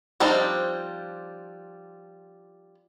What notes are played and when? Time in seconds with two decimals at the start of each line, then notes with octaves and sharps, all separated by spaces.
0.20 F3 G3 C4 D4 D#4